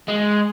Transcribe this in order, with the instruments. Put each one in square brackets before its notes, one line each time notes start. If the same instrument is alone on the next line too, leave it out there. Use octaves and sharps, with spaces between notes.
[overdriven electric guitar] G#3